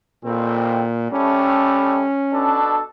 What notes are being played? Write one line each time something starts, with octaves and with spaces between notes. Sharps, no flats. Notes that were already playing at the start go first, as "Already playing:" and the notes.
A1 F2 A#2 C4
C2 G3 A3 C#4
B2 D4 A4